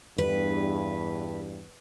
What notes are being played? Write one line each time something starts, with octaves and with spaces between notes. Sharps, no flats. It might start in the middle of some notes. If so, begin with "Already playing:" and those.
E2 G2 B4